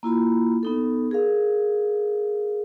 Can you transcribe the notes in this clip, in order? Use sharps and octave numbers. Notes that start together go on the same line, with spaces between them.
A#3 E4 F4 B5
B3 D#4 A4
G#4 A#4 F5